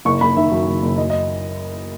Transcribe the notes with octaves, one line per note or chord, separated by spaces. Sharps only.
F#1 C#6
F#1 B5
D#3 E5
F#2
F#1
F#1
F#2 D#5
D#5